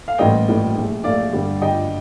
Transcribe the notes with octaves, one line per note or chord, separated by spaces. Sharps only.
F5
A1 A2 G3 A#3 D#5 G5
A1 A2 G3 A#3
A#1 A#2 A3
A#1 A#2 A3 D5 F5
G2 D3 G3
G2 D3 G3 D#5 G5